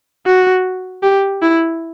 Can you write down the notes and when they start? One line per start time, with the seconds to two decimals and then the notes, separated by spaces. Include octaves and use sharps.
0.26 F#4
1.03 G4
1.42 E4